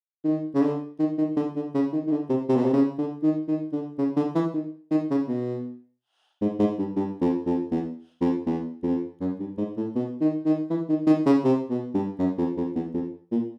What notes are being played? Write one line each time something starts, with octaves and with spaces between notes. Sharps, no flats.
D#3
C#3
D3
D#3
D#3
D3
D3
C#3
D#3
D#3
D3
C3
C3
B2
C3
C#3
D3
D#3
D#3
D3
C#3
D3
E3
D#3
D#3
C#3
B2
G#2
G#2
G2
G2
F2
F2
E2
F2
E2
F2
F#2
G2
G#2
A2
B2
D#3
D#3
E3
D#3
D#3
C#3
C3
B2
G2
F#2
F2
F2
E2
F2
A#2